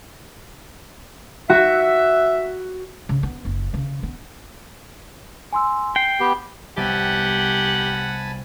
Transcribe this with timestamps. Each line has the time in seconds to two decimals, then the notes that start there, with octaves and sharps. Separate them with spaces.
1.50 F#4 E5
3.09 C#3
3.23 B3
3.45 F#1
3.74 C#3
4.03 B3
5.53 G#5 C6 E6
5.96 G5 C7
6.20 B3 G4
6.77 C2 G3 B3 G4 F#5 G#5 A5 B5